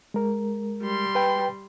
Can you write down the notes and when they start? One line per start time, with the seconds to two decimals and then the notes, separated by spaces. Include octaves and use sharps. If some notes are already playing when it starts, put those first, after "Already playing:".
0.14 G#3 A#4
0.83 G3 C6
1.15 B4 G5